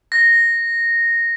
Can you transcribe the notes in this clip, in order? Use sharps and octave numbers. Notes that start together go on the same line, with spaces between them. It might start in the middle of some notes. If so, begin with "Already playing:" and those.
A#6